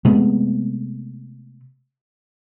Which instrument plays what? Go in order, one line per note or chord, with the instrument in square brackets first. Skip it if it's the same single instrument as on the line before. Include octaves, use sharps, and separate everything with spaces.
[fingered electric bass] C3 G#3 A3 B3